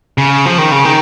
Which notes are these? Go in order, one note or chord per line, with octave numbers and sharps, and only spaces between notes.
C#3
F3
D#3
C#3
D#3